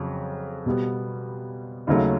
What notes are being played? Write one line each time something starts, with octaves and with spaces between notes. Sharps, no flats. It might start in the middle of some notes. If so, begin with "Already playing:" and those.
Already playing: F2 C#3 F#3
B2 G3 B3
D#2 C#3 F#3 A3